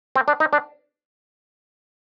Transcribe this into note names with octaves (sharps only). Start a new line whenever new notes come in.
C4
D4
D#4
D4